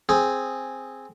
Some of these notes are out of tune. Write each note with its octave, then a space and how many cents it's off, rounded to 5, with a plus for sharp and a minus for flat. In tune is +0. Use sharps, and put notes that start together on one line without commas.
C4 +0 G#4 +0